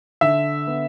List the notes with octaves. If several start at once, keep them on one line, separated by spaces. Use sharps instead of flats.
D3 E5
B3